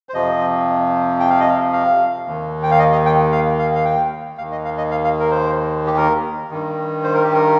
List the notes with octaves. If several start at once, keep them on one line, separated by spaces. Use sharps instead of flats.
C5
F2 C3 F3 D#5
G5
F5
D#5
F5
F5
D#2 D#3
G5
F5
D#5
D#5
G5
F5
F5
F5
G5
D#2 D#3 F5
D#5
F5
D#5
F5
F5
A#4
C5
G4
A#4
G2 D#3
C5
A#4
G4
A#4